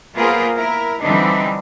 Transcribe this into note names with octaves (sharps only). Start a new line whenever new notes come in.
A#3 B3 F4 G#4 A#4 C5
E4 A#4
D3 E3 G3 C4 D4 D#4